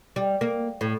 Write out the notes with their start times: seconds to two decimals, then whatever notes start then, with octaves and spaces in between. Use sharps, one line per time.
0.16 G3
0.41 A#3
0.81 A2